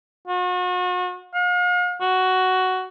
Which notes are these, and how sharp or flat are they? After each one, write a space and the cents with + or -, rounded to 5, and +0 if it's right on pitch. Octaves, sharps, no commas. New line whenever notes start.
F#4 -40
F5 +40
F#4 +10